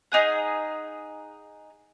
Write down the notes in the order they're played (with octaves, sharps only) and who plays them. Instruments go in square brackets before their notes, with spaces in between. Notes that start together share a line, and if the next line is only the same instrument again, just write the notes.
[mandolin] D#4 G#4 F#5